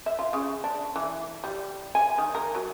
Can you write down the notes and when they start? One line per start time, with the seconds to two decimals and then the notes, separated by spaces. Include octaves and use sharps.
0.06 E5
0.19 F4
0.33 C#3
0.64 D4
0.96 E3
1.44 G3
1.95 G#5
2.18 D#3
2.35 A#4
2.55 F#3